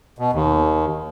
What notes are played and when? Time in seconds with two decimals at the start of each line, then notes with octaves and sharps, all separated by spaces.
0.19 B2
0.33 D#2